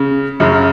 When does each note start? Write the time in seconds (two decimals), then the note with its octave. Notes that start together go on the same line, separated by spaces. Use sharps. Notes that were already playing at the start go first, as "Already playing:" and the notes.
Already playing: C#3
0.40 F#2 C#3